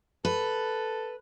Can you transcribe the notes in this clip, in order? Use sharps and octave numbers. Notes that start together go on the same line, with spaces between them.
A4 B4